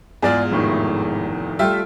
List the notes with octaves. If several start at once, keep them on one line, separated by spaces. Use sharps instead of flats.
E2 G#2 G#3 F4 G#4 D5
F1 A2 D#3
G3 A3 F4 E5 G5